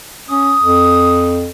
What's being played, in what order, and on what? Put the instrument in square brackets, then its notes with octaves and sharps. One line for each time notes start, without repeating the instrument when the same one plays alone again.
[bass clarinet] C#4 [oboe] D#6
[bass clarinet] F2